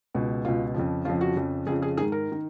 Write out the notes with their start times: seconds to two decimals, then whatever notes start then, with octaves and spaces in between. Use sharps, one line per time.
0.14 C#2 B2
0.45 C#2 B2 F4
0.74 F2 C#3 F3
1.05 F2 C#3 F3 F4
1.21 F#4
1.36 F2 C#3 F3
1.66 F2 C#3 F3 G#4
1.82 G#4
1.97 G#2 D#3 G#4
2.12 A#4
2.32 D#3